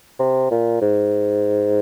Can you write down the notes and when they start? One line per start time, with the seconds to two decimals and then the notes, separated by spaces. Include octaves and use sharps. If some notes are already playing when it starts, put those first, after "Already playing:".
0.19 C3
0.51 A#2
0.82 G#2